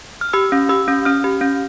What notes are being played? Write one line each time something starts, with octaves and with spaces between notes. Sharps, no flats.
F6
G4 E6
C#4
G4 E6
C#4
C#4 F6
G4
C#4